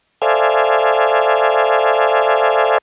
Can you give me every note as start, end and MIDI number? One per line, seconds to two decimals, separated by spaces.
0.22 2.78 69
0.22 2.78 72
0.22 2.78 74
0.22 2.78 76
0.22 2.78 77
0.22 2.78 80